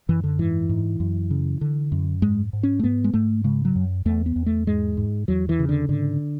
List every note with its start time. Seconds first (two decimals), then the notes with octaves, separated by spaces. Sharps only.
0.09 F#2 E3
0.24 D3
0.39 G#2 E3
0.69 G#2
1.00 F#2
1.31 C#3
1.61 D3
1.92 F#2
2.22 G#2 G#3
2.53 G#2
2.63 C#4
2.79 A3
2.83 G#2 B3
3.04 G#3
3.14 G#2 A3
3.44 C#3 G#3
3.65 F#3
3.76 F#2
4.05 E2 A3
4.26 B3
4.36 E2
4.46 A3
4.67 G#2 G#3
4.97 G#2
5.28 E2 F#3
5.49 E3
5.59 C#3
5.69 D3
5.89 G#2 D3